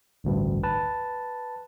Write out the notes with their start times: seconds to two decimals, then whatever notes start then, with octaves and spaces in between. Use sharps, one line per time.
0.24 A1 D2 G2
0.63 B4 A5